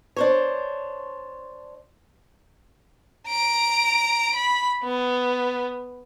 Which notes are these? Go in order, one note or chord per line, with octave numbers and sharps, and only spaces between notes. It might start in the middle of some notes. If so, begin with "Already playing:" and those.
D4 C5 C#5
A#5 D7
B5
B3